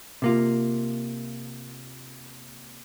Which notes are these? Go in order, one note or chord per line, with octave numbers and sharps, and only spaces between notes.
C3 A#3 F4